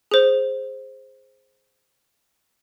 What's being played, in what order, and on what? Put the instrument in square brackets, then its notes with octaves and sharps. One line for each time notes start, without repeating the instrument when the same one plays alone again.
[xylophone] G#4 C5